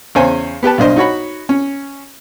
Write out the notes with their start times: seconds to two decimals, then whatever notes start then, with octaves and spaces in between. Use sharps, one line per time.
0.15 E2 C#3 C5 C#5 G#5
0.63 B3 G4 B4 A5
0.78 B1 G2 D4 C5 D#5
0.96 D#4 F#4 C#5 B5
1.49 C#4